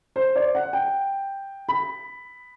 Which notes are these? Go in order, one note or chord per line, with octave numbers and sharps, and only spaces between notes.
C5
D5
F#5
G5
B5